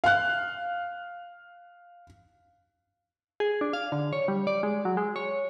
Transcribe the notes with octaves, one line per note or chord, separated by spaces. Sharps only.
F5 F#6
G#4
D4
F5
D3
C#5
G3
D5
G#3
F#3
G#3
C#5